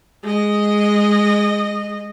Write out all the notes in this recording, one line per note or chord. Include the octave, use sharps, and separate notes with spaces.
G#3 D#5